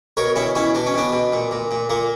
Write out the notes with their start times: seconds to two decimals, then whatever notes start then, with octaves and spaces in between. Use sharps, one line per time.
0.17 B2 A#4 C#5
0.36 B2 C#4 E4
0.55 B2 C#4 E4
0.75 B2 D4
0.86 C#4
0.94 B2 B3 D4
1.13 B2
1.33 A#2
1.51 A#2
1.71 A#2
1.90 A#2 A#3